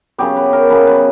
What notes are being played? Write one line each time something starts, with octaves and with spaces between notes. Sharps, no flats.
C#3 F#3 B3 G4
B4
A#4
C#3 F#3 B3 B4
B4